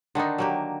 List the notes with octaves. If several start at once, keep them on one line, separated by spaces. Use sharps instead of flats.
D3 D#3 D4 D#4
F#3 A#3 G4